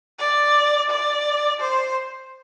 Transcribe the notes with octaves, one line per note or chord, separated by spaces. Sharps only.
D5
D5
C5